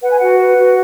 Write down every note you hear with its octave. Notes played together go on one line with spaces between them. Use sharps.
B4 F#5
G#5
F#4 F#5
B4
F#4